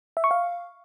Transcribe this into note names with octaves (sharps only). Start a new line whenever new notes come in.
E5
C#6
F5